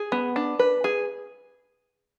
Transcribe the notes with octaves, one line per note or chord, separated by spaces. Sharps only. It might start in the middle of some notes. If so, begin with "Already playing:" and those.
Already playing: G#4
B3
D4
B4
G#4